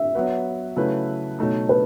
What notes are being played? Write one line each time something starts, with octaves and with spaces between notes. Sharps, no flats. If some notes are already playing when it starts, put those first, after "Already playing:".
Already playing: E5
F#3 B3 F#4 B4
C#3 F#3 A3 E4 B4
B2 F#3 A3 D#4
B4